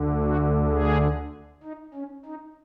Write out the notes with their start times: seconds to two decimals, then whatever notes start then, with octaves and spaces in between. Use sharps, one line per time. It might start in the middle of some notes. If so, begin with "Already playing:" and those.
Already playing: D2 D3
0.23 F#4
0.70 G#4
1.63 D#4
1.94 C#4
2.26 D#4